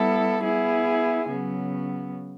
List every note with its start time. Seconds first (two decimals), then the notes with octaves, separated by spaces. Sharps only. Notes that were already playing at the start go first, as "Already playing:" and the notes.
Already playing: G3 B3 E4 A4
0.44 B3 E4 G#4
1.27 C#3 F#3 B3